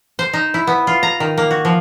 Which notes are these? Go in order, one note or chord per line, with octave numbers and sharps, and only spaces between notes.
C5
D#4
E4
B3
F4
A#5
D#3
A#3
F#4
F3